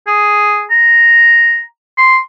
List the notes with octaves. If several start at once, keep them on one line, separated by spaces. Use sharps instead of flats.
G#4
A#5
C6